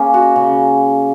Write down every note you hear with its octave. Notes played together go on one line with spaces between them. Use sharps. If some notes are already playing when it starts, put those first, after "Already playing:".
Already playing: A#3 C#4 G#4
F#4
C#3